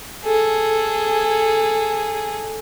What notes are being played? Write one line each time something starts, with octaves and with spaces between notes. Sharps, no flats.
G#4 A4